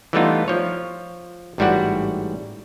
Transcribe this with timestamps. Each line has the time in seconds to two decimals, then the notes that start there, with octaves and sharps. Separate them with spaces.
0.13 E3 G3 A3 B3 D#4 F4
0.48 F3 C#5
1.58 A1 G#2 G3 E4 F#4 F#5